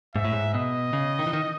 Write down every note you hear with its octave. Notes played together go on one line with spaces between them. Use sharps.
G#2 E5
A2
G#2
B2 D#5
C#3
D#3
E3
D#3